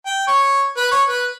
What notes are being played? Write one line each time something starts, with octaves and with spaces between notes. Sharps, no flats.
G5
C#5
B4
C#5
B4